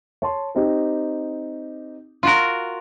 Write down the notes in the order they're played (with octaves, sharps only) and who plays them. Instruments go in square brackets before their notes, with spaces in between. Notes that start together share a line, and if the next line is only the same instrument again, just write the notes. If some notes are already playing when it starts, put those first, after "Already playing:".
[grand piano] C#5 A5 C6
C4 D#4 G4
[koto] F4 F#4 A#4